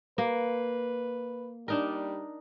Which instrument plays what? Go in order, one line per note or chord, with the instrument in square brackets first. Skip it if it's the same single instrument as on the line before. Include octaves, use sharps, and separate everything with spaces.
[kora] A#3 [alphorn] B4
[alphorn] G3 [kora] D4 D#4 A#4